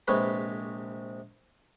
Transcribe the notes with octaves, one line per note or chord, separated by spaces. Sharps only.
A#1 C3 G#3 B4 C#5 B5